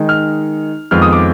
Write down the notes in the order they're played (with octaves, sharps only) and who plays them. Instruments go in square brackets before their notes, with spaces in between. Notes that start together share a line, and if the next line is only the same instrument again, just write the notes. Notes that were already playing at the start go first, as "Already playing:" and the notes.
Already playing: [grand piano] D#3 G#3 D#4
F6
F2 D#3 G#3 B3 F4 F6
D#6
D6